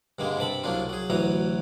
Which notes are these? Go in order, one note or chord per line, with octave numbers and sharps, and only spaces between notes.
G2 D3 G#3 A#3
G2 C3 A5 B5
C2 F#3 A#3 D4 F4
F#3 G#4
A1 D2 E3 F#3 A#5